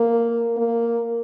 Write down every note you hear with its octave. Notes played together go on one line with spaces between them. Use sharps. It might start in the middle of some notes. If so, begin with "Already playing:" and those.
Already playing: A#3
A#3